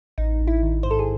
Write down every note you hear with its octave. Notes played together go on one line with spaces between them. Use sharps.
A1 D#4
A1
E4
D#3
G#2 C5
A4
G#4